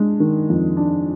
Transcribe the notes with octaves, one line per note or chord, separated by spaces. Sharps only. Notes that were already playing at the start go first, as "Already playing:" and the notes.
Already playing: G#3 D4
D#3
F2
D4